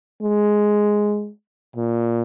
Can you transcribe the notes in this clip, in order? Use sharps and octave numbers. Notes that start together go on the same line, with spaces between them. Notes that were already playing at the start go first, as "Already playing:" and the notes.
G#3
A#2